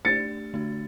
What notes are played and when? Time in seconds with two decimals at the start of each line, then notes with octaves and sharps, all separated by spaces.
0.05 A3 D4 G4 D5 A6 C#7
0.54 D3 A3 D4 F#4